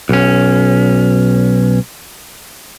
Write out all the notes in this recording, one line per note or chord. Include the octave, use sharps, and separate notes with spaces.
B1 C#4